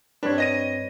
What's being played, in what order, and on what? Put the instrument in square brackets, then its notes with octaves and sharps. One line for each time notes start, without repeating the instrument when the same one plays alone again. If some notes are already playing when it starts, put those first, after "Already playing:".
[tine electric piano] G2 G3 C4 [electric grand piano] D4 [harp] B4 C#5
[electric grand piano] D#5 A#6 D#7